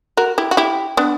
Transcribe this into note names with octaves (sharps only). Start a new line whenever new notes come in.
F#4 A#4
E4 G4
F#4
E4 G4
B3 D4